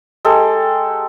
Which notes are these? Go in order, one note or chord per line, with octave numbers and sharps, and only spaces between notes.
G#3 G4 A4